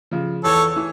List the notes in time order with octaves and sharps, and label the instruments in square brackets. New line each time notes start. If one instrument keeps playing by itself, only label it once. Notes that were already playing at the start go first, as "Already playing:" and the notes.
[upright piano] C#3 F3
[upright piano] E2 [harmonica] A4 C#5
[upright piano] E3